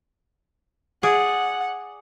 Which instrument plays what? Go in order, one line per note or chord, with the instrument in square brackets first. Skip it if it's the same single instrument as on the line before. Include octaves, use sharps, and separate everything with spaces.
[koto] G#4 D5 [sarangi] F#5